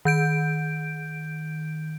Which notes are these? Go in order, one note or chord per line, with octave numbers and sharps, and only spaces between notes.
D#3 G6 D7